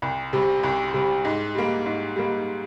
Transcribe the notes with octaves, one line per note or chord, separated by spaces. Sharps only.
C2
C3 G3
C2
C3 G3
G#2
G3 A#3
G#2
G3 A#3